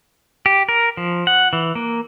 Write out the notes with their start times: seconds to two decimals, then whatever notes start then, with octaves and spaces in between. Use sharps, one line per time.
0.46 G4
0.69 A#4
0.97 F3
1.27 F#5
1.53 E3
1.75 A#3